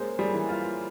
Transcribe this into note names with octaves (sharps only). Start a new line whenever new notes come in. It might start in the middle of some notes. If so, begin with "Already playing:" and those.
Already playing: G#3 A#3 C#4 C5
G3 G#4
E3
F4